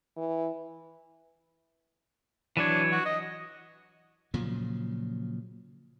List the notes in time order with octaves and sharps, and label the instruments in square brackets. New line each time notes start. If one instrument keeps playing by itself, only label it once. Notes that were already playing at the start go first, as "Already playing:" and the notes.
[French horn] E3
[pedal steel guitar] E3 F#3 C#5 [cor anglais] D4
[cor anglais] F#4
D#5
[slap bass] A#2 C#3 F3 F#3